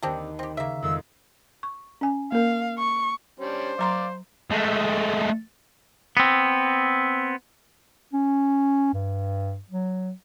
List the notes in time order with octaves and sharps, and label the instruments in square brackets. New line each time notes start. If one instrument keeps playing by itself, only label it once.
[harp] D#2 D#3 [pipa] C4 D4 G4
[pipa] C4 G4
[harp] C#3 [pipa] A#3 E5
[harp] F2 D#3 G#3 [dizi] E6
[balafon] C#6
C#4 G#5
[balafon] A#3 A#4 [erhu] F5
[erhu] C#6
[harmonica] G3 C#4 D4 [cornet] C5
[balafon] F#3 A#5 C6 [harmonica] D5 F5
[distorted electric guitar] G#3 A3
[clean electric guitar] B3 C4
[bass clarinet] C#4
G2
F#3